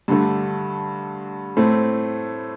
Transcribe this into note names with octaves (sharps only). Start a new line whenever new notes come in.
G2 D3 A3
A2 A3 C4